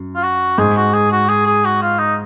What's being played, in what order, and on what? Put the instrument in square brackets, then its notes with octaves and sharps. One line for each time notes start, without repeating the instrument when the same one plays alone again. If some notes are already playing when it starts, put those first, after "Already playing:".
Already playing: [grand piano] F#2
[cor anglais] F4
F#4
[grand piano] G#2 [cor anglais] G#4
[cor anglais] F#4
G#4
F#4
G#4
G#4
F#4
F4
D#4